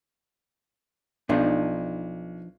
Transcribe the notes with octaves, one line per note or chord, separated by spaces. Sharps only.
B1 F3 D4 D#4